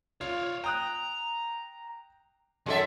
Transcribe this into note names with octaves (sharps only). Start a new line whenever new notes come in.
F4 C#5 D5
G5 A#5 D#6 F#6
F#2 D#3 G#4 A4 E5